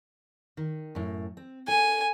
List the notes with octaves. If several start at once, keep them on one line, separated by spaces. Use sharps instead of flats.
D#3
F#2 A2
C4
A4 G#5